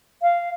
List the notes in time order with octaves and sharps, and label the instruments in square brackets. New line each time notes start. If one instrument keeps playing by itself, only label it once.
[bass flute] F5